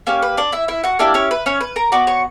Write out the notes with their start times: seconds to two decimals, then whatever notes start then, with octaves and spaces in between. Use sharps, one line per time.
0.07 A#3 C#4 G4 C#5
0.22 B4
0.37 D4 D5
0.52 E4 E5
0.68 E4 E5
0.84 F#4 F#5
0.99 A#3 D4 E4 G4 D5
1.14 C#4 C#5
1.31 B4
1.46 C#4 C#5
1.61 B4
1.76 A#4 A#5
1.92 B3 F#4 D5 D6
2.07 C#5 C#6